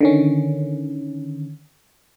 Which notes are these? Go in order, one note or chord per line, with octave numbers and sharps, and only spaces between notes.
D3 D#3 C#4